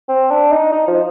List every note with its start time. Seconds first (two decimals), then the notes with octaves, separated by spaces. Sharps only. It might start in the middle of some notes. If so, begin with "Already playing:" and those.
0.09 C4
0.31 D4
0.51 D#4
0.72 D#4
0.87 F3